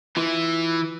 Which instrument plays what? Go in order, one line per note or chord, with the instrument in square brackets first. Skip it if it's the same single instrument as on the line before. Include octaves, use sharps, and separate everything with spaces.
[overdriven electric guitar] E3 [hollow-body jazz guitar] E4 F4